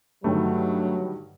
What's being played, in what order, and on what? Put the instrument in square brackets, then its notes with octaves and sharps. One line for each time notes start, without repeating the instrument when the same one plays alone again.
[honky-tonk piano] G2 D3 D#3 [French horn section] F#3 [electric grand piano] A3